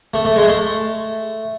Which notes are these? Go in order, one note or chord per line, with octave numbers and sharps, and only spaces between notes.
A3
A3
G#3
A3